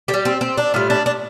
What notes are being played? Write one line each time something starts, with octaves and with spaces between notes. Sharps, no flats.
D3 G4
G3
C4
C4
D4
A2 G3 F4
D4
D4